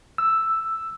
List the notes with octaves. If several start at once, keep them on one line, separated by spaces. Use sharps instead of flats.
E6